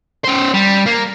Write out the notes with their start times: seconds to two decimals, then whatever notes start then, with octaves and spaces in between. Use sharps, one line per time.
0.24 C#4 C5
0.54 G3
0.86 A#3